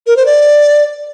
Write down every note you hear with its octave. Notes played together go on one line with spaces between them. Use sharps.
A#4
C5
D5